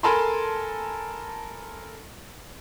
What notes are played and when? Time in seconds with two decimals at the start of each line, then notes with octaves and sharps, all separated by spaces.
0.03 A4 A#4 G#5 A5 B5 C6